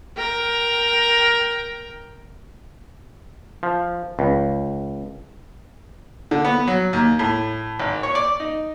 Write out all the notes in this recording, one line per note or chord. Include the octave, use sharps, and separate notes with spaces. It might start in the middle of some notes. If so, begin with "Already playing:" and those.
A#4 G5
F3
C#2
D3
B3
F#3
D#2
A2
G#1
C#5
D5
D#4